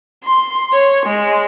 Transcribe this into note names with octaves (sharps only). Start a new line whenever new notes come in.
C6
C#5
G#3